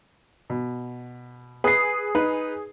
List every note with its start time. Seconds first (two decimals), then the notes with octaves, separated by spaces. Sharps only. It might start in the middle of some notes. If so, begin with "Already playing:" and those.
0.50 B2
1.64 G#4 B4 C7
2.15 D#4 B4